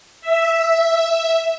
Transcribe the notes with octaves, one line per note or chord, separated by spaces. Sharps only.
E5